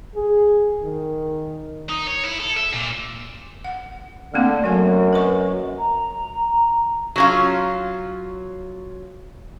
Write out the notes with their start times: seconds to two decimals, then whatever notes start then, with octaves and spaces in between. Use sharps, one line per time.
0.16 G#4
0.82 D#3
1.89 D#4
2.07 C#5
2.24 E4
2.40 A4
2.57 E5
2.73 A#2
3.65 F#5
4.34 D3 A3 A#3 C4
4.64 F#2 F#3 G#5
5.13 B4 D#5 C#6
5.78 A#5
7.16 F#3 C#4 F4